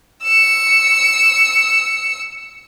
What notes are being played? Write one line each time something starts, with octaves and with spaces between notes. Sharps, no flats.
E6 C#7